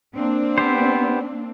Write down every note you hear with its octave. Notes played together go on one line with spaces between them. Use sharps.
A#3 C4 D4
B3 G4 C5